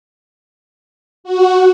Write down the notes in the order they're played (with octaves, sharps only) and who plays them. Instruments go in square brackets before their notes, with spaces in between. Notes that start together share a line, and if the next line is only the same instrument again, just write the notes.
[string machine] F#4